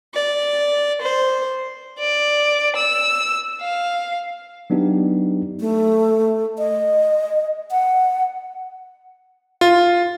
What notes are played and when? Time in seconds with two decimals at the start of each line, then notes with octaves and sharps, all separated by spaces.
0.12 D5
1.02 C5
1.99 D5
2.76 E6
3.62 F5
4.70 F#3 B3 D4 D#4 G4
5.60 A3
6.58 D#5
7.71 F#5
9.61 F4